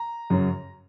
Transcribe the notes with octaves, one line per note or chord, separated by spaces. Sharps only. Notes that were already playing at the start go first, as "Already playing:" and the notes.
Already playing: A#5
F#2 C#3 F#3